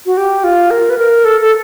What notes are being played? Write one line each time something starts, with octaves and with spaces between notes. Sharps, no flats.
F#4
G4
F4
A#4
B4
A#4
A4
A4